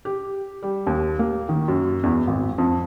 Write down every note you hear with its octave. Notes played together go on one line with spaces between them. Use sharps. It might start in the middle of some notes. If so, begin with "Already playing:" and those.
G4
G3
D#2
A#3
D#3
F#2
E2
G#1
F2